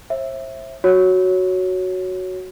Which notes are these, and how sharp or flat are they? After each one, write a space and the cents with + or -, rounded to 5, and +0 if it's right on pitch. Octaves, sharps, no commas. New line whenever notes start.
C5 +45 E5 +0
F#4 +0 C#5 +0